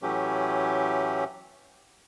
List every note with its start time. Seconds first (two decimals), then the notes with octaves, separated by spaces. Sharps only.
0.02 A2 E3 F#3 A3 C#4 G4